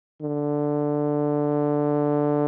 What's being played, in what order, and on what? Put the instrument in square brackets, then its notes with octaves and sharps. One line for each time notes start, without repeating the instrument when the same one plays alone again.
[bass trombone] D3